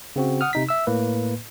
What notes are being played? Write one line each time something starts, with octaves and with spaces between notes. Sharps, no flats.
C#3 C4 F#4
F#5 D#6 F6
C3 D#4 B6
E5 E6
A2 A#3 B4